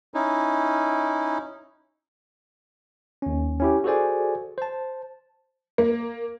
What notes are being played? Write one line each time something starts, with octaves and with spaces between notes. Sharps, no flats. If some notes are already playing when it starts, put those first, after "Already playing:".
C#4 D#4 E4
D#2 C#4
C#4 E4 G4
F#4 G#4 A4 C5 D5 G#5
C5 A5
A#3